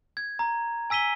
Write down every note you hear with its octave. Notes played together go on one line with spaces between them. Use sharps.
G#6
A#5
G#5 E6 B6 D#7 G7